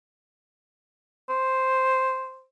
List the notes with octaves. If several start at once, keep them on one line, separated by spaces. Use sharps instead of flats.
C5